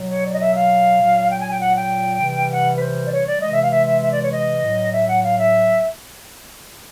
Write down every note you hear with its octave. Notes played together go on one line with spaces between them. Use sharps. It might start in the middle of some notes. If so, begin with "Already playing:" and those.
Already playing: B2 F#3
C#5
D5
D#5
E5
F5
A#2 F#3
G5
G#5
G5
F#5
G5
C3 E3 G3
F#5
B4
C5
D5
C#5
D5
C3 E3 G#3 D#5
E5
F5
E5
E5
E5
D5
C#5
D#5
A2 F#3
E5
F#5
F5
E5